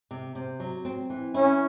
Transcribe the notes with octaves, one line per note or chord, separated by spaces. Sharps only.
C3
C3
F#3
C4
E3
C#4 E4